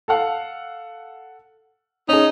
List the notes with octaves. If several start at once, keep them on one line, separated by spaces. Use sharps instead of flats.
A4 F5 F#5
C#4 D#4 G#4